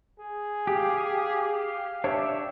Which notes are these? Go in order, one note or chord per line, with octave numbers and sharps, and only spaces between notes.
G#4
G4 F5
D4 G4 C#5 E5